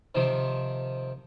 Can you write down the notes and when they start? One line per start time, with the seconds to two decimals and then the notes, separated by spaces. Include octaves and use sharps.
0.15 C3 D#3 F3